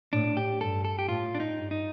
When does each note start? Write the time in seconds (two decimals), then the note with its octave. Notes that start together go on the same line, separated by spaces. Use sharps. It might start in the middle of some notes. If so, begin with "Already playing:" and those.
0.13 A2 D4
0.37 G4
0.61 G2 A4
0.85 A4
0.99 G4
1.08 A2 F4
1.35 D4
1.40 D#4
1.56 G2
1.71 D#4